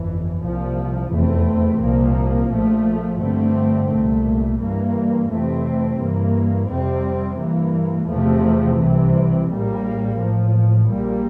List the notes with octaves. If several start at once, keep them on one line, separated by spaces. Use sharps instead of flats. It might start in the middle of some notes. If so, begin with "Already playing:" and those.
Already playing: G1 F2 E3
C2 A#2 F3
F1 E2 E3 A3 C4
C2 A#2 F3 A#3
A#1 A#2 F3 A3
G2 D3 A3 C4
C2 A#2 A3
G2 E3 A#3
F2 C3 E3 A3 C4
G2 E3 A#3
F2 C3 G3 C4
G2 E3 A#3
E2 C3 F3 A3
C2 C3 E3
A#1 A2 G3 A#3
A1 A2 F3
A#1 A#2 G3 A#3